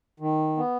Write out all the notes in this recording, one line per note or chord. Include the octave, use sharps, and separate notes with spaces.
D#3
B3